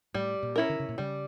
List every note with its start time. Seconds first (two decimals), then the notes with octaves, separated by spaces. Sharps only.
0.14 A2 G3
0.43 A#2
0.56 C#4 E4 A#4
0.69 D3
0.80 C#3
0.89 A#2
0.98 C#3 G3